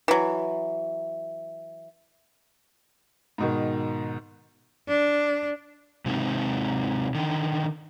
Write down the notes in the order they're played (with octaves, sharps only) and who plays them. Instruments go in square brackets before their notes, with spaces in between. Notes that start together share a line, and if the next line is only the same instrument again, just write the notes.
[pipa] E3 F#3
[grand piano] G#2 B2 D#3
[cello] D4
[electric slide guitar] C3 G#3 C4 D#4
D3 D#3